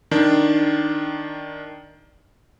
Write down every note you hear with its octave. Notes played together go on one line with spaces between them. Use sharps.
D#3 D4